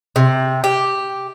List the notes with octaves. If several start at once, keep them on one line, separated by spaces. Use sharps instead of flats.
C3
G4